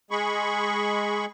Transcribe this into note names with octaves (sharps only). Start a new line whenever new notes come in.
G#3 G#4 B5 C#6